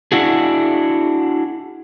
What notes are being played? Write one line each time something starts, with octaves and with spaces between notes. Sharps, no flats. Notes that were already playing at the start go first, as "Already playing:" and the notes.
D4 E4 F#4 G#4